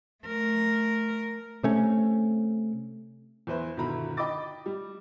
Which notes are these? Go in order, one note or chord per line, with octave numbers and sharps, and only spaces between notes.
A3 A#4
C3 A3 C#4
E2 B4 C5 E5
G1 B2 D#3 E4 A#5 B5
D#5 G5 B5 D6 A6
G3